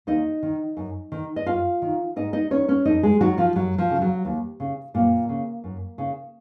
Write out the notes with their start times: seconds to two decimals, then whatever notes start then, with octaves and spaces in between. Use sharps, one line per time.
0.07 D#2 D#4 D#5
0.43 D#3
0.77 F#2
1.12 D#3
1.36 D#5
1.46 F#2 F4 F5
1.82 D#3
2.16 G#2 D#4 D#5
2.33 D#4 D#5
2.51 D#3 C#4 C#5
2.68 C#4 C#5
2.85 F2 D#4 D#5
3.03 G#3 G#4
3.20 D#3 F#3 F#4
3.38 F3 F4
3.55 F#2 F#3
3.78 F3
3.90 C#3
4.01 F#3
4.25 D#2
4.60 C#3
4.94 F#2 A#2 A#3
5.29 C#3
5.64 F#2
5.98 C#3